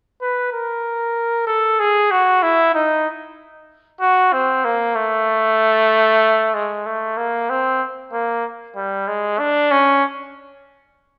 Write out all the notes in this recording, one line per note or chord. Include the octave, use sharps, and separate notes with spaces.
B4
A#4
A4
G#4
F#4
E4
D#4
F#4
C4
A#3
A3
G#3
A3
A#3
C4
A#3
G3
G#3
D4
C#4